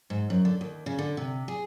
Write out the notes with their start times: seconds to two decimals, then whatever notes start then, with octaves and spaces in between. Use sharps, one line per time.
0.10 G#2
0.30 F#2
0.45 D3
0.61 D#2
0.86 C#3
0.98 D3
1.17 C3
1.48 G#4